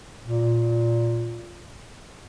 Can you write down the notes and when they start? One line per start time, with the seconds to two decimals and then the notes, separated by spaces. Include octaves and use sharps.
0.24 A#2